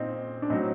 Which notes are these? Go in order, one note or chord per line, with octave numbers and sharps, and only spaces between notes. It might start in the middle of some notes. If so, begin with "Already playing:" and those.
Already playing: A#2 C4 D#4
D4
A2 F#3 C4 D#4